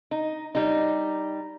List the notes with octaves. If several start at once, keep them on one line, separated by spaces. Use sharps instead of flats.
D#4
G3 D#4